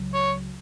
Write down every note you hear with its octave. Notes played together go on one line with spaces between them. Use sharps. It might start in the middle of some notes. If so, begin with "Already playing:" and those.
Already playing: C#2 C#3 F#3
C#5